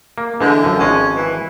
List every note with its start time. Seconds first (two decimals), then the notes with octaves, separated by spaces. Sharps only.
0.18 A#3
0.41 D3 E3 G#3
0.64 F#2 F3
0.79 G#1 F3 G#3 C#4
1.15 E3